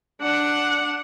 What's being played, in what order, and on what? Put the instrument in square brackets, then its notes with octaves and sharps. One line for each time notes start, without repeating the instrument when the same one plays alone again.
[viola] D4 F#5